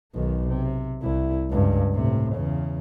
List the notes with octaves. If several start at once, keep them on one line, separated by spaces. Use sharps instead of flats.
B1 D#3
C3
C2 E4
C#2 G2
A2 C3
E2 C#3